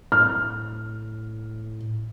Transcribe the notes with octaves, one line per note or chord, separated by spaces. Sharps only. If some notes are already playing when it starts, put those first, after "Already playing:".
A2 F6